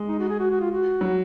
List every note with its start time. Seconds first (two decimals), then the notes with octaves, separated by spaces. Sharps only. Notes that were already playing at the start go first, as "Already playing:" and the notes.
Already playing: G#3
0.08 D#4
0.19 F#4
0.29 G#4
0.39 F#4
0.50 F#4
0.60 F4
0.71 F#4
1.01 F#3